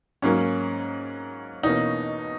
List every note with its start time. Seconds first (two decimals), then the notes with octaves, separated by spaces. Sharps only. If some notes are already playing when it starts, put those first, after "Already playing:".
0.22 G#2 F#3 A#3 C#4
1.63 E2 B2 A#3 C#4 D#4